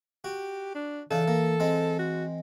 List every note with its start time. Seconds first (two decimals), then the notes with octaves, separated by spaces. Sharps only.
0.24 F#4 G4
0.75 D4
1.11 C#3 E3 D4 A4 F5
1.28 A#3
1.60 G#3 C4
1.99 F#4